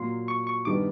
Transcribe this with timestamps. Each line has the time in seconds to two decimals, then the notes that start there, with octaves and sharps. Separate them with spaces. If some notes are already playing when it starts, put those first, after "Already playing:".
Already playing: A#2 F#3 A#3 C6
0.28 C#6
0.47 C#6
0.65 G2 D#3 G3 B3 D#4 D6